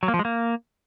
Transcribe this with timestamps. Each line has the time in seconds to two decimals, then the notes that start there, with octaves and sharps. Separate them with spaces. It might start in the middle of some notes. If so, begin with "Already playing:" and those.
0.03 F#3
0.08 A#3
0.14 F3
0.19 G#3
0.25 A#3